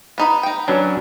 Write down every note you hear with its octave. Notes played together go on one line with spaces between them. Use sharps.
B3 D#4 B5
D#4 G5
E3 F#3 C#4 D4